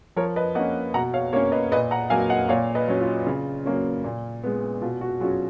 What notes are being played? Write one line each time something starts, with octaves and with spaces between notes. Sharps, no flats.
F3 A#4 C#5
B4 D#5
A#3 C#4 D#5 F#5
B2 F#5 A#5
C#5 F5
A#3 C#4 C#5 F5
B4 D#5
A#2 B4 D#5
F#5 A#5
F#3 A#3 F5 G#5
D#5 F#5
A#2 C#5 F5
B4 D#5
F#3 C#4
F4
C#3
F#3 A#3 C#4
A#2
G#3 B3
B2 F4
F#4
F#3 C#4 F4 G#4